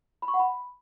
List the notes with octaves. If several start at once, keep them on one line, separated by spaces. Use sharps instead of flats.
B5
C#6
F#5
B5